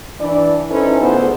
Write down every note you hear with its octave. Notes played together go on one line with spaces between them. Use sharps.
E3 D4 D5
C#4 D#4 E4 A4 B4 C5
D2 D3 B3 F4 G#4 C5